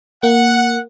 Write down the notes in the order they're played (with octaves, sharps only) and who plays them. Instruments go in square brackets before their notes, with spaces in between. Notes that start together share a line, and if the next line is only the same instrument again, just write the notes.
[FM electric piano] A#3 [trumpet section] F#5